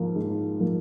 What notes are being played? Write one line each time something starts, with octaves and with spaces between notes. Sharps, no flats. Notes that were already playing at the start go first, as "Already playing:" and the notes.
Already playing: G#2 F3 A#3
G#2
F3 A#3